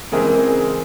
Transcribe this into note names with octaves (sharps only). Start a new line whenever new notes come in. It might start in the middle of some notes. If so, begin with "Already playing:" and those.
C#3 E3 G#3 C4 G#4 A#4